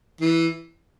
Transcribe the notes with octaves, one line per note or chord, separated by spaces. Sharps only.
E3